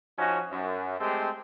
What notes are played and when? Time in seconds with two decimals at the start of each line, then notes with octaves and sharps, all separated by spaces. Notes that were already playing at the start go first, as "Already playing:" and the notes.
0.18 F3 C#4 D#4 F#4
0.52 F#2
1.01 G#3 A3 C4 G4